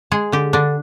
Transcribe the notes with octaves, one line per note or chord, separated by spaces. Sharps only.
G#3 G#4
D3 G4
D3 D4